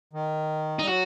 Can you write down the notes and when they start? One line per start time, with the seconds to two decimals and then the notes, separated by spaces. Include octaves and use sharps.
0.13 D#3
0.79 G3 D#4
0.89 F#3 F#4